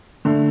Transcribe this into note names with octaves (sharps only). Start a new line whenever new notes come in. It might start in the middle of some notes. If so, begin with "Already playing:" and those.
D3 A3